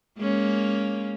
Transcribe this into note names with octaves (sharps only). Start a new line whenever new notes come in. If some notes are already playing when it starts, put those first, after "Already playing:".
G#3 A#3 C#4